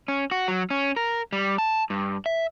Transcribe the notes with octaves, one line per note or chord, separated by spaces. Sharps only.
C#4
F#4
F#3
C#4
A#4
G3
A5
G2
E5